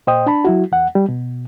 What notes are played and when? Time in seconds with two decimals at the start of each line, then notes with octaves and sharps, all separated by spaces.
0.07 A#2 C5 D#5 G5 D#6
0.26 D4 A5 B5
0.45 F#3 E4 F#4
0.72 E2 F#5
0.95 G3
1.09 B2